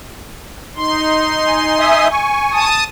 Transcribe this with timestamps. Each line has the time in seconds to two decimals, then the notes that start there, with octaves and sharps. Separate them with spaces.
0.76 D#4 C6
1.46 G#5
1.79 E5 G#5 D#6
2.11 G#5 C#6
2.52 A5 D#6